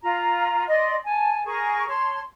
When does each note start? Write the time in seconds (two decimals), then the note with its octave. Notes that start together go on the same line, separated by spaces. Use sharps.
0.02 F4 A#5
0.67 D5 D#5 C6
1.05 G#5 A5
1.45 G#4 A#4 C#6
1.88 C#5 A5 C6